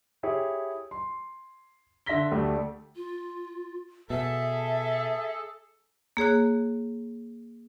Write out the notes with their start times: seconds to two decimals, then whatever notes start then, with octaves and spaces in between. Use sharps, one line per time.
0.23 E4 G4 G#4 C#5
0.91 C6
2.06 D3 E5 C6 A#6 B6 G7
2.31 D2 A3 G4 D5
2.96 F4
4.10 B2 G#4 A4 E5
6.17 A#3 G#4 C#5 F#6